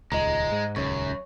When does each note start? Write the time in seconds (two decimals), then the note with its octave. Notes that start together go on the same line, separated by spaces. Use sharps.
0.12 D#1 C#2 G#3 D#5 A#5
0.52 G#2
0.76 D#1 C#2 F#2 C#3 C#5 C#6